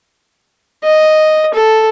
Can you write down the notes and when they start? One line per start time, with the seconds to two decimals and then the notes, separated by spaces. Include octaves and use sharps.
0.84 D#5
1.54 A4